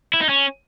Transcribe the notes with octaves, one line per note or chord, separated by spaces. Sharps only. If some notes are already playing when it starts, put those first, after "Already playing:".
E4
D#4
C#4